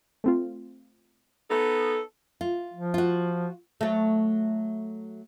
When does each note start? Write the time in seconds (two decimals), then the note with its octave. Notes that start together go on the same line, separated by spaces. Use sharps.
0.24 A3 C4 F4
1.50 B3 D#4 A4
2.41 F4
2.73 F3
2.94 F4 F#4
3.81 F#3 A3